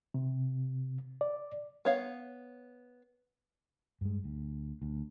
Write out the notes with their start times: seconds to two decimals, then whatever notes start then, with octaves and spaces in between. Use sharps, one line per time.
0.14 C3
1.21 D5
1.85 B3 C#5 F5
4.01 G2 G#3
4.24 D2
4.82 D2